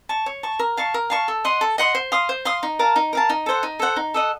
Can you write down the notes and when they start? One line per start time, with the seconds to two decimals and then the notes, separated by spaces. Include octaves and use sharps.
0.09 A5 C#6
0.26 C#5
0.43 A5 C#6
0.59 A#4
0.77 F5 A5 C#6
0.94 A#4
1.10 F5 A5 C#6
1.28 A4
1.45 D#5 F#5 C6
1.61 A4
1.78 D#5 F#5 C6
1.95 C5
2.12 F5 C6 D#6
2.29 C5
2.45 F5 C6 D#6
2.63 D#4
2.79 A#4 F5 A5
2.96 D#4
3.13 A#4 F5 A5
3.29 D#4
3.46 A4 C5 F#5
3.63 D#4
3.79 A4 C5 F#5
3.96 D#4
4.14 A4 D#5 F#5